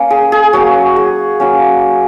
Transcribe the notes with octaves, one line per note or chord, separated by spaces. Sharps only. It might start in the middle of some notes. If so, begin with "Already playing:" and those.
Already playing: A#3 C#4 G#5
G#4
G#4
F#3 A#3 C#4 F#4
G#4
F#3 A#3 C#4